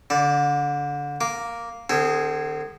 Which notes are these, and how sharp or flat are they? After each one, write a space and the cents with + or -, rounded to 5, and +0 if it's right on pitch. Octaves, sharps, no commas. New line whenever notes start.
D3 -25 D5 +0
A#3 +0 D6 -10
D3 +45 C4 +0 G#4 -5